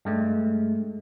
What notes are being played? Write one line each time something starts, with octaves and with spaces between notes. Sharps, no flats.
G2 G#3 A3